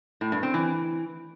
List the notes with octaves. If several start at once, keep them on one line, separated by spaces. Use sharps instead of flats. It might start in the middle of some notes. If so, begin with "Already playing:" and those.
A2
G2
C4
E3